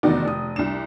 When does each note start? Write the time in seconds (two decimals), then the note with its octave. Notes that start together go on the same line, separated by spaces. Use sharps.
0.03 F1 E2 D#3 D#4 F#4 D5
0.25 F1 D#6
0.56 C2 D4 E7